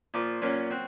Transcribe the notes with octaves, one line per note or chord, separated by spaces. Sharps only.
A#2 F3 A#3
A#2 F#3 A#3 C#4
C4 F#4